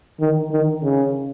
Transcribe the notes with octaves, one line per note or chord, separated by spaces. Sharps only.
D#3
D#3
C#3